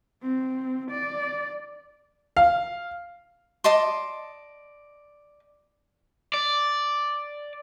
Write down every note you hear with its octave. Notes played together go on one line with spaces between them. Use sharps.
C4
D5
F5
D5 D#5 A5 C6
D5